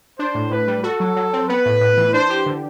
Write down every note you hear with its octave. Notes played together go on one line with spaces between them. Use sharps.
D4 C5
A2
A2 B4
G3
F#4 A4
F#3
F#3
C4
B3 B4
A2
A2
E3
D4 C5
G4
D3